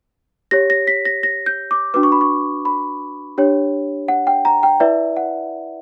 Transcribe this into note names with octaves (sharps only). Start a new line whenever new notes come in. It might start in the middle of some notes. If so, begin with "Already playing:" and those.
G4 C#5 A#6
A#6
B6
A#6
A#6
G6
D6
D4 F#4 B4 D6
C#6
B5
C#6
B5
D4 G4 C#5
F#5
G5
A#5
G5
E4 B4 D5 E5
F#5